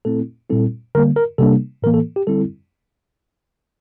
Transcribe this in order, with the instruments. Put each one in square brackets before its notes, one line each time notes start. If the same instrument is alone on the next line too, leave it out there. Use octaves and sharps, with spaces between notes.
[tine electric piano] A#2 A3 C4 E4 A4
A#2 G3 C4 E4 A4
D3 G3 A#3 A#4
A#4
C3 G3 A#3 D4 A4
A2 E3 A#3 A#4
A4
G4
D3 G3 C4 E4 A4